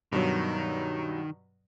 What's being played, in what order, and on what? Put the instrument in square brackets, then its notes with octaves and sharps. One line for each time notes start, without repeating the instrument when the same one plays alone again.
[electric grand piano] G2 B2 F#3 [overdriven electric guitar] D#3